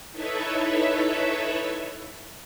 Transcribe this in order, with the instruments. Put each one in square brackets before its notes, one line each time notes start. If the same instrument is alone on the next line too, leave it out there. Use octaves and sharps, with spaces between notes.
[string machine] D#4 E4 A4 B4 C#5 E5